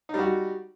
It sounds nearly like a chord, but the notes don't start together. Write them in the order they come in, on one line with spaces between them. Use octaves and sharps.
D#4 G3 F#4